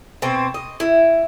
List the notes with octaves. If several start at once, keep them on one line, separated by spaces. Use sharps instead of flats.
B2 C4
D#5
E4